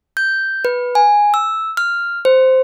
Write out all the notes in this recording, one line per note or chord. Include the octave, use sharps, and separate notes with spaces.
G6
B4
G#5
E6
F6
C5